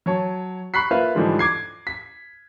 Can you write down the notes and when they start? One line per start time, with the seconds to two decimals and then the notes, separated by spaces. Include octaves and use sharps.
0.06 F#3 C#5 A5
0.74 B5 C#6 F#6 B6 C7
0.91 A#3 F4 B4 E5 F5
1.15 G#2 D3 E3 F3 G3 D#4
1.39 D6 G#6 C7
1.87 B6